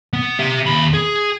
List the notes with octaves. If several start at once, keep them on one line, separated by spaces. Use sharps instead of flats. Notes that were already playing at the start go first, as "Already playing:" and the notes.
B3
G4 E5
D#2 B5
G#4